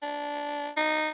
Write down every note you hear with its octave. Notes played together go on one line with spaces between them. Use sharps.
D4
D#4